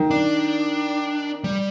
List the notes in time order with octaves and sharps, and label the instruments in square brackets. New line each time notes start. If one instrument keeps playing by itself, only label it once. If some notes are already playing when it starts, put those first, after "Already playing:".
Already playing: [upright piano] D#3
[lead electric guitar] D4
G3